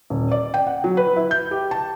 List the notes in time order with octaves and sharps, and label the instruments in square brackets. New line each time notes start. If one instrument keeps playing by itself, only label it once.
[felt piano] D#1
D5
G5
F#5
F#3
B4
E4
G6
G4
A5